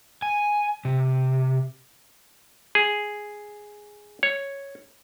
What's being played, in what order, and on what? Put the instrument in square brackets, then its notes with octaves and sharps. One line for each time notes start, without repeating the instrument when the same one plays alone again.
[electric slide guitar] G#5
C3
[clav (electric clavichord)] G#4
C#5